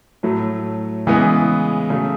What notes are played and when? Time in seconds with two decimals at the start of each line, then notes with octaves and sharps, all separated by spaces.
0.23 A2 F#3 A3
1.07 C#3 E3 G#3 B3
1.90 C#3 F#3 A3